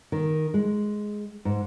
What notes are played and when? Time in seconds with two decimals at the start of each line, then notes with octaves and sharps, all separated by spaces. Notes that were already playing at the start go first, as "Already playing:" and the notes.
0.12 D#3
0.54 G#3
1.45 G#2